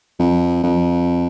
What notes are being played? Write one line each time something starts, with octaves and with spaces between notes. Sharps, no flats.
F2
F2